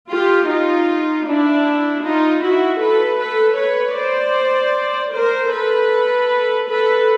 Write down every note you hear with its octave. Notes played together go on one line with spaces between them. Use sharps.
F4 G4
D#4 F4
D4 E4
D#4 F4
E4 F#4
A4 B4
A4 B4
B4 C#5
C5 D5
A#4 C5
A4 B4
A4 B4